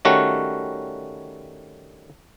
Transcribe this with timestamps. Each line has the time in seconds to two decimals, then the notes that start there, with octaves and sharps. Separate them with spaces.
0.05 D#3 G3 A3 C#4 F#4